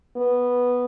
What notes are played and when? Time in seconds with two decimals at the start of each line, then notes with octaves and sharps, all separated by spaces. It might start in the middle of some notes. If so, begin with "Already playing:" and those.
0.17 B3